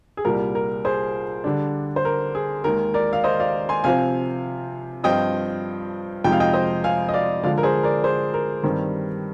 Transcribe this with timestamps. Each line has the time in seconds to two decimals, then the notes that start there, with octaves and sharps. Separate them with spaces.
0.17 G#4
0.25 C2 A#2 G3 A#4
0.55 A#4
0.85 G#4 C5
1.44 D3 G3 D4
1.96 C5
2.05 A#4
2.35 G#4
2.64 D#2 D#3 G#3 A#4
2.94 A#4 D5
3.13 F5
3.24 C5 D#5
3.40 D5 F5
3.69 G#5 C6
3.84 C3 F3 C4 F5 G#5
5.03 G2 F3 C4 F4 D#5 G5
6.24 F2 C3 F3 G#3 D#4 G5
6.32 F5
6.40 D#5 G5
6.53 C5 D#5
6.84 F5 G#5
7.09 D#5
7.14 D5 F5
7.43 D3 F3 G#3 D5 F5
7.58 A#4
7.63 G#4 C5
7.83 A#4 D5
8.04 G#4 C5
8.34 A#4
8.63 G2 D#3 G3 C4